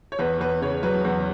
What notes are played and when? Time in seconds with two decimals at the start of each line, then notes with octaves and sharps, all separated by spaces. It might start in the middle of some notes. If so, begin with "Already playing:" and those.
0.12 C#5
0.19 E2 B4
0.40 E2 B4
0.62 C#3 C#5
0.83 F#3 B4
1.05 E2